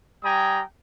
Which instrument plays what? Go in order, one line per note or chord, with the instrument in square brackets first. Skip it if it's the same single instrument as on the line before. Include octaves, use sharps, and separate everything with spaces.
[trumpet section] G3 G5 G#5 A#5 D#6